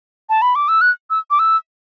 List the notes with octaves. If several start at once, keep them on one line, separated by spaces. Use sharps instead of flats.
A5
B5
D6
E6
F#6
E6
D6
E6